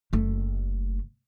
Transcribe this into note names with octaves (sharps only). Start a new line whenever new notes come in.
F#1 A3